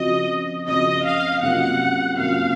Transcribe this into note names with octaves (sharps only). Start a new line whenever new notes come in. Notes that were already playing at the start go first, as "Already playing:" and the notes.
Already playing: C#3 F3 C4 F#4 D#5
C#3 F3 C4 F#4 D#5
F5
C3 F#3 A#3 C#4 F4 F#5
C3 F#3 A#3 C#4 F4 F5